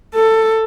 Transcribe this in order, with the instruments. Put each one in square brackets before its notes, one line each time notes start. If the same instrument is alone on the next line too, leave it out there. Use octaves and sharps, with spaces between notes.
[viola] A4